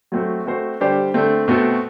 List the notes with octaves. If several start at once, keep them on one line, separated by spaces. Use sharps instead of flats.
F#3 A3 C4 F#4
A3 C4 F#4 C5
D3 G3 D4 G4 C5
D3 A3 C4
B2 A3 C4 F#4 A4